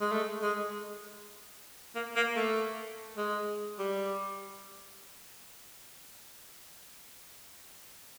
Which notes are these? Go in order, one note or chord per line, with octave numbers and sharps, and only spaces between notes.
G#3
A3
G#3
A#3
A#3
A3
G#3
G3